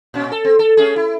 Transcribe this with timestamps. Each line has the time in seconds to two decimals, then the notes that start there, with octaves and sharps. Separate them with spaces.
0.14 A#2 C#4
0.32 A4
0.44 C4
0.59 A4
0.77 A3 C#4 G#4
0.96 E4